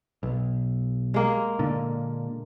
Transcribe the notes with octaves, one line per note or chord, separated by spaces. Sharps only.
B1
G#3 A#3
A#2 D3